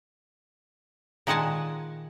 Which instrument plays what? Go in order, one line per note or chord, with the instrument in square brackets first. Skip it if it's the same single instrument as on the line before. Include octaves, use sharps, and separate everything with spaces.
[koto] A#2 D#3 G#3 F#5 G#5 A5